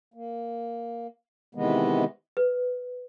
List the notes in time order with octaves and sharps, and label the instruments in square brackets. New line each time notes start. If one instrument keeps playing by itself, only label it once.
[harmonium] A#3
C3 D#3 E3 G#3 B3
[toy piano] B4